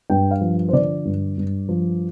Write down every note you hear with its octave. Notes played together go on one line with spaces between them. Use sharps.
G2 G5
F5
F3
C5
D3 D5
G2
G2
F3